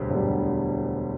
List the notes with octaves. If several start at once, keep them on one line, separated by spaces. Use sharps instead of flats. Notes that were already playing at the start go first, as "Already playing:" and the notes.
Already playing: E1 D2 D3 G3
E1 D2 D3 G3